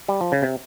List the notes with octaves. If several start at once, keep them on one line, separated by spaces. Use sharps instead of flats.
G3
F3
C#3
C3